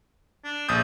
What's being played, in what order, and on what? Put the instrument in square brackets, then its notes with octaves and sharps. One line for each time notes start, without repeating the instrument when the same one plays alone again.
[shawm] D4
[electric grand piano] A#1 D#6 G6 [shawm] A4